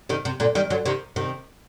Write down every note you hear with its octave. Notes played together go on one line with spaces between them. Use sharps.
C3 D#3
C3
A#2 D3
D#3 G3
D3 F#3
C3 D#3
C3 D#3